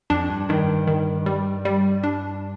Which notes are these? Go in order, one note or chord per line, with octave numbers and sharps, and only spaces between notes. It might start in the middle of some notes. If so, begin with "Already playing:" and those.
F2 D4
G2
G2 D#3
D#3
G3
G3
D4